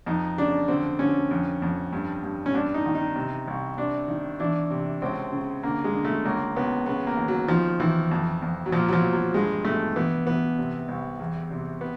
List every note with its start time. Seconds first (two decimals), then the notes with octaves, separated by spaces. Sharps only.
0.06 F2 D#4
0.38 C#3 D4
0.68 D3 C4
0.99 D3 C#4
1.31 F2
1.62 F2
1.93 G2
2.23 G2
2.46 C#4
2.54 G2 D4
2.74 D#4
2.86 D#3
2.95 D#4
3.16 C3
3.47 C2
3.77 C3 D4
4.08 D#3
4.40 E3 D4
4.71 C3
5.02 C#2 C4
5.32 C#3
5.63 D3 A#3
5.84 G#3
5.94 D3
6.05 A3
6.25 C#2 A#3
6.56 C#2 B3
6.86 C#3 B3
7.07 A#3
7.17 D#2
7.28 F#3
7.48 D#3 F3
7.80 D#3 E3
8.11 F2
8.42 F2
8.66 F#3
8.72 A#2 F3
8.88 F#3
8.93 F3
9.03 A#2
9.13 F#3
9.34 G2 G#3
9.65 G2 A3
9.96 E3 B3
10.26 E3 B3
10.58 C3
10.88 C2
11.19 E2
11.51 C3
11.81 B3